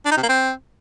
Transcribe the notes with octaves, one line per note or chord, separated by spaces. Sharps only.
D4
D#4
C3
A#3
C4